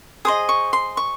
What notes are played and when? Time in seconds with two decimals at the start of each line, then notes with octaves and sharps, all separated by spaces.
0.25 G#4 C5 D#5 D#6
0.49 C#6
0.73 C6
0.97 C#6